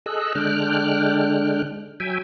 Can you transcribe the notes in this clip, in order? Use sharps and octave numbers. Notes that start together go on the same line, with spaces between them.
G#4 A4 D#5 E6 F#6
D3 G#3 D4 G5 F6 F#6
F#3 E5 G5 G#5